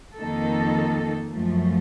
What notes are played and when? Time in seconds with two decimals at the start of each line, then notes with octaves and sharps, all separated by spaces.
0.18 F2 D#3 A#3 D#4 A4
1.33 F#2 F3 A3